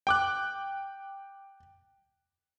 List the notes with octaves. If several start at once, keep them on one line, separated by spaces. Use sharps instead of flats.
G5 D6 F#6